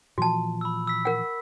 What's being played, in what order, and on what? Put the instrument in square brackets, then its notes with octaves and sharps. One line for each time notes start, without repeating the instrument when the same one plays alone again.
[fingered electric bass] A#2 E3 F3 [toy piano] F#4 A5
[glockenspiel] B5 E6
E6 B6
[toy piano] A#4 F#5